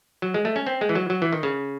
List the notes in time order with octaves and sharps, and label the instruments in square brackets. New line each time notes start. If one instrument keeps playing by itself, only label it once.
[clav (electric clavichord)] F#3
G#3
A3
C#4
C4
G#3
E3
F#3
F#3
E3
D#3
C#3